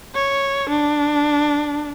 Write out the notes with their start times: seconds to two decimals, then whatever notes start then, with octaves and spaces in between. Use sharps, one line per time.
0.14 C#5
0.70 D4